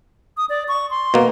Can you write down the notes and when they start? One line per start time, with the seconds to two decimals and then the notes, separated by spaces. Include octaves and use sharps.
0.37 D#6
0.49 D5
0.68 C#6
0.91 C6
1.14 B2 A#3